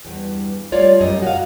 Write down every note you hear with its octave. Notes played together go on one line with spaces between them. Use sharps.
E2 G2
G3 A3 F4 C#5 D5 F5
F#2 G3 D#5
F#4 F5